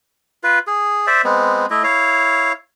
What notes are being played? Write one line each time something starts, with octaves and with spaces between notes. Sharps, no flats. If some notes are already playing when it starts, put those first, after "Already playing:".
F4 B4
G#4
C5 D5 E5
G#3 B3 C4
A3 E4 D#5
E4 C#5 F5